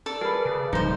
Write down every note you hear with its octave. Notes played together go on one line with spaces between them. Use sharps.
A4 D5
G#4 A#4 B4
C#3
D1 F3 G3 D#4 C5